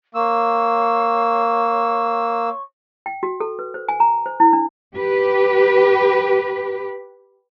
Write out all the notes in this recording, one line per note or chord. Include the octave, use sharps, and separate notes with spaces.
A#3 C#5 C6 C#6 E6
G5
F#4
A4
B4
C5
G#5
A#5
C5
E4
D4
G4 B4